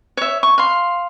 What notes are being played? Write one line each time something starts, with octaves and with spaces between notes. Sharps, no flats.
C#5 E5
C#6
F5 C6